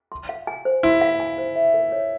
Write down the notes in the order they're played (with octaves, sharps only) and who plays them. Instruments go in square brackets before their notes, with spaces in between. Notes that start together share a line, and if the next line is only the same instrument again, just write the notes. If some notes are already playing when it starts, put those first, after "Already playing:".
[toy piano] C6
F5
G#5
C5
[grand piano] E4 [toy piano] C6
[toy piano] F5
G#5
C5
E5
A#4
C#5